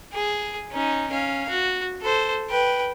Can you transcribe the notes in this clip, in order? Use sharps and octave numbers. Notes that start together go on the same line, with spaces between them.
G#4
C#4 D#4
C#4 F5
F#4
A4 C5
B4 G5